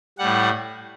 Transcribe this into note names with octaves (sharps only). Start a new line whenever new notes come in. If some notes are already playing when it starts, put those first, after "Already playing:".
A2 G3 F#5